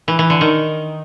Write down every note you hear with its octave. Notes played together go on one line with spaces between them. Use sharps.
E3
E3
D3
D#3